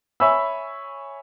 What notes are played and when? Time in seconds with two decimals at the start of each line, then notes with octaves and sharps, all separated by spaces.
0.20 C#5 E5 G#5 B5 E6